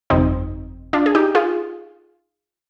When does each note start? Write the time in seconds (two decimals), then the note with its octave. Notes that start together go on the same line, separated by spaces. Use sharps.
0.10 G1 F2 C3 C4 D#4
0.93 D4 F4
1.06 G#4
1.15 D#4 G4
1.35 F4 G#4